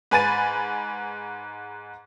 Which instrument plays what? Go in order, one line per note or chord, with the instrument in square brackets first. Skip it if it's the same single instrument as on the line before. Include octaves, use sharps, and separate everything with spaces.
[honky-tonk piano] G#2 B4 G#5 B5 A6 D#7